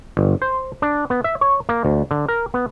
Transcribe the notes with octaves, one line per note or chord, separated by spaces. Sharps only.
G1
C5
D4
B3
E5
C#5
A#3
D2
D3
A#4
B3